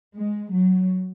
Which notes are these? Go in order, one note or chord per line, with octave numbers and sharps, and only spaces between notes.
G#3
F#3